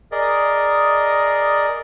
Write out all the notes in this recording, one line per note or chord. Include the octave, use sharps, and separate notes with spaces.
G#4 A#4 D5 D#5